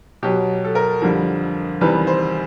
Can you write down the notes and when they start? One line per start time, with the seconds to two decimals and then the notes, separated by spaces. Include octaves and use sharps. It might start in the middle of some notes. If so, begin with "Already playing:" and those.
0.23 B2 F#3 G4
0.65 A4
0.75 A#4
1.02 F2 D3 G3
1.81 E2 C3 D#3 G3 B4
2.07 C5